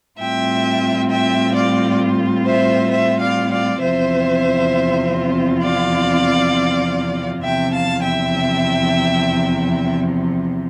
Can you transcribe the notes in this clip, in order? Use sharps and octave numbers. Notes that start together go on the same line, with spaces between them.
A2 G3 C4 F4 E5 G5
E5 G5
D5 F5
C5 E5
C5 E5
D5 F5
D5 F5
E2 C3 F3 C4 F4 C5 E5
D5 F5
E2 C3 F3 E5 G5
F5 A5
E5 G5